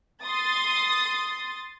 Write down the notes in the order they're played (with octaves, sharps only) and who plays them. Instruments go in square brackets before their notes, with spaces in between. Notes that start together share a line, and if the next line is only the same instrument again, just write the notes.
[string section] C6 D#6 A6